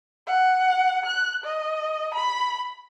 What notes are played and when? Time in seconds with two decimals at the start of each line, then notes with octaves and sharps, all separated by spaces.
0.27 F#5
1.06 F#6
1.44 D#5
2.14 B5